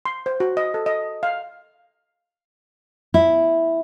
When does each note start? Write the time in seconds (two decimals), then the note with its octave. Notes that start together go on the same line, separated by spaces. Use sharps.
0.05 C6
0.26 C5
0.40 F#4
0.57 D#5
0.74 A4
0.86 D#5
1.23 F5
3.14 E4